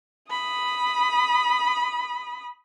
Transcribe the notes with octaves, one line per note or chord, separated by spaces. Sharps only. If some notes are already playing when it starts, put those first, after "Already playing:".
B5 D#6